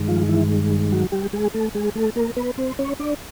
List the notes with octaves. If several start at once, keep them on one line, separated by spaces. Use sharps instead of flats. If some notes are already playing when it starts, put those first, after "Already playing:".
Already playing: G2 D#3 G#3
F3 F4
E3 E4
F#3 F#4
G3 G4
G#3 G#4
A3 A4
G#3 G#4
A3 A4
A#3 A#4
B3 B4
C4 C5
C#4 C#5
D4 D5